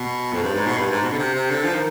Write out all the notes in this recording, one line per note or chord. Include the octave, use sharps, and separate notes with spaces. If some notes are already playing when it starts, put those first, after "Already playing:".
Already playing: B2
F2
G2
G#2
B2
G2
G#2
B2
D3
C3
C3
D3
F3
D#3